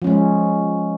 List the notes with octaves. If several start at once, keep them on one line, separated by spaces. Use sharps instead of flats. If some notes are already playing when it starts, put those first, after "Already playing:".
F3 G#3 C#4